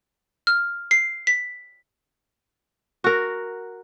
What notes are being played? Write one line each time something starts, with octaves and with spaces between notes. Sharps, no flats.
F6
C7
B6
F#4 A#4